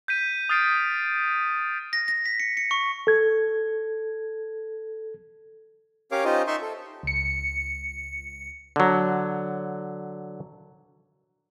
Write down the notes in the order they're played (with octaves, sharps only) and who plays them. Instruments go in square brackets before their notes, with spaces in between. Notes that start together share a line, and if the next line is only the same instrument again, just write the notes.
[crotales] G6 B6 D#7
D#6 F6 A6 C7 D7
[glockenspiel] A#6
A#6
B6
C#7
C#7
C#6
[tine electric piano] A4 G#6
[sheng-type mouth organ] C#4 G4 A#4 C#5 F5 D6
C#4 D#4 F4 G4 C5 D#5
D#4 E5 C6 C#6
A4
[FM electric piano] C#2 C#7
[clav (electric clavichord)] D3 F#3